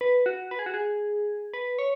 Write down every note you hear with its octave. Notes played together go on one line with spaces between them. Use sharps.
B4
F#4
B4
G#4
F#4
G#4
B4
C#5